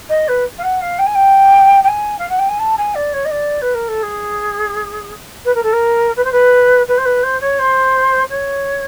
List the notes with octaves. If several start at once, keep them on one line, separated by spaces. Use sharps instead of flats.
D#5
B4
F5
F#5
F5
G5
G#5
G5
G5
G#5
F5
F#5
G5
G#5
A5
G#5
D5
C#5
D#5
D5
B4
A#4
A4
G#4
B4
A#4
A4
A#4
B4
C5
B4
B4
C5
B4
C5
C#5
C5
C#5